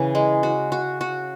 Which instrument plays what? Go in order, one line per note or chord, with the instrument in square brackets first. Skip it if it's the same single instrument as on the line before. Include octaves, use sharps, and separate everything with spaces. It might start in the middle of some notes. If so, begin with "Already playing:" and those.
Already playing: [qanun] C#3 E3
G#3
F#4
F#4
F#4